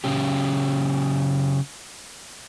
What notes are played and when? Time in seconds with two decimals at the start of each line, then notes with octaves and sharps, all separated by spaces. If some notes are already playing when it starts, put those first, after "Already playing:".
0.04 C#3 F#3 C#4 G4